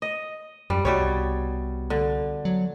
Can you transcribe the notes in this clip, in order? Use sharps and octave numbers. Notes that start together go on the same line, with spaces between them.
D#5
F#2 G3
C2 B2 G3 C#5
D3
F#3